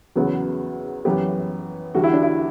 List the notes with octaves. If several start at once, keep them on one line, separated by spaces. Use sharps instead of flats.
E2 C#3 F#3 B3
F#2 E3 B3 G4
E2 D3 G3 F#4
E4
D4
E4